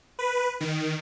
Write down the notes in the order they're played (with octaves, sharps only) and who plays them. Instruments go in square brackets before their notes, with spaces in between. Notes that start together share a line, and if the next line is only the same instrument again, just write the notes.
[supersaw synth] B4
D#3